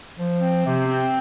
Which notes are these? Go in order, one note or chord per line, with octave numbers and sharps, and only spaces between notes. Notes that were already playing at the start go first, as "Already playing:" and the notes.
F3
C4
C3
C4